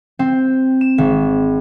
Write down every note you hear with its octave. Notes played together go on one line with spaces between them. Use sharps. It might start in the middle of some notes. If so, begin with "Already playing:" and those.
C4
E7
G#1